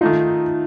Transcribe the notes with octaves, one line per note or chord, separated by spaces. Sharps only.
D#3 A3 D#4 F4